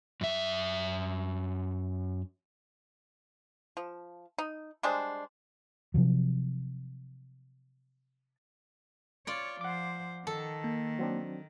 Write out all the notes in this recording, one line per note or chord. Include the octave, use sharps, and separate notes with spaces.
F#2 E5
F3
D#4
G3 G#3 D4 C5
C3 F3 F#3
F4 C#5 D5
F3 C5 F#5 D6
D#3 A4
A#3
F#3 C4 D4